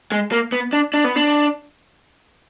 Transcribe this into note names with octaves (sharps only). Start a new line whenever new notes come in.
G#3
A#3
B3
D4
D4
B3
D4